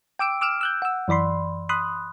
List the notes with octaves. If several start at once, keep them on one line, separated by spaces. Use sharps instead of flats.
G5 D6 E6 D7
D6 E6 F6 D7 E7
E6 F#6 G6
F#5 E6
F#2 E3 D5 B5 C6
B5 C6 D#6 F#6